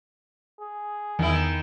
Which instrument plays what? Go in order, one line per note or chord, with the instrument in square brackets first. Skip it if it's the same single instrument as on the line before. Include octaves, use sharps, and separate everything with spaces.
[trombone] G#4
[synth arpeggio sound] E2 [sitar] D#3 E4